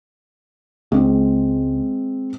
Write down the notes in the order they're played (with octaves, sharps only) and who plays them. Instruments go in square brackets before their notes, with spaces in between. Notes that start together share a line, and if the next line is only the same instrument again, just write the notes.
[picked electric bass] C#2 [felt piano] G#3 C4